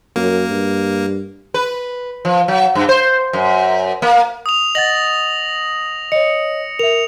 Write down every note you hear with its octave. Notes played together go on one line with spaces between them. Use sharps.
F#2 A#3
G2
B4
F3
F#3
G2
C5
F#2
A#3
D#6 F7
D#5 F#5 A6 A#6 F#7
C#5 D#5 C#7
A#4 E5 F7